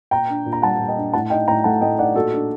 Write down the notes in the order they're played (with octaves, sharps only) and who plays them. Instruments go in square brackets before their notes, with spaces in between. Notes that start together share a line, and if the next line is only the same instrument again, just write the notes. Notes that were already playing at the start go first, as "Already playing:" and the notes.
[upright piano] A#2 G5 A#5
D4
A#2
A#5
G3 F#5 A5
A#2
D#5 G5
D4
A2 F#5 A5
D#4 D#5 G5
A2 G5 A#5
A3 F#5 A5
A2 D#5 G5
D#4 D5 F#5
A#2 F#4 A4
D4